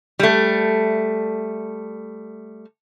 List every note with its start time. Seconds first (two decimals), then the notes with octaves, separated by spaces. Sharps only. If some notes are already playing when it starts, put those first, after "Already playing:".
0.19 G3 A3